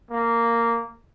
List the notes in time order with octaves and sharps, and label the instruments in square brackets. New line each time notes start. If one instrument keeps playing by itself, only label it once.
[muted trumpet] A#3